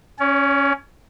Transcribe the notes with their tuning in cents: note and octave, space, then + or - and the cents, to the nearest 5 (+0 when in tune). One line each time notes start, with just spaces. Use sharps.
C#4 +0 C#5 +45